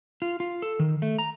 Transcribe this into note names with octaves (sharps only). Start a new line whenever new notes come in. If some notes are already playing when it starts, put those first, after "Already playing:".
F4
F4
A4
D#3
A3
A#5